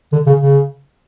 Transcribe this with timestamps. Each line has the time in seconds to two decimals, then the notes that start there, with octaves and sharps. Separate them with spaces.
0.12 D3
0.27 C#3
0.41 C#3